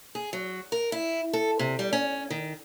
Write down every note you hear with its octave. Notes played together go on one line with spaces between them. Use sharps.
G#4
F#3
A#4
E4
A4
C3
G3
C#4
D#3